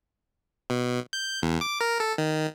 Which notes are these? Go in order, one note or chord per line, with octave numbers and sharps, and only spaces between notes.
B2
G6
E2
D6
A#4
A4
D#3